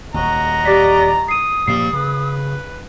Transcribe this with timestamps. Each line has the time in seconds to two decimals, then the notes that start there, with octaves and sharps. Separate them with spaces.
0.14 D#1 D#2 F#4 D#5 A#5
0.65 G4 D5 B6
1.28 D#6 C7 D#7
1.67 A#2 F3 G3 A#3 C7
1.93 C#3 B4